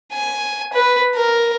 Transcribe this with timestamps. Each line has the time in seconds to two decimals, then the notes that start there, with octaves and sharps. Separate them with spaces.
0.14 G#5
0.73 B4
1.15 A#4